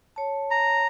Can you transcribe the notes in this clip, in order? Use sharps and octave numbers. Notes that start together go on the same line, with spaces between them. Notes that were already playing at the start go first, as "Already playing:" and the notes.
C#5 A5
A#5